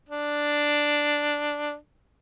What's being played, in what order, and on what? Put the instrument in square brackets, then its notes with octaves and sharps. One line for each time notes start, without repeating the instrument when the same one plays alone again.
[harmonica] D4